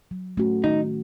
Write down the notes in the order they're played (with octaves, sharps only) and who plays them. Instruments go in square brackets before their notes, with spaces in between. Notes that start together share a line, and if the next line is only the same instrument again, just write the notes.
[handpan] F#3
A3 C#4 F#4
[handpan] D#3 [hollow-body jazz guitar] D#4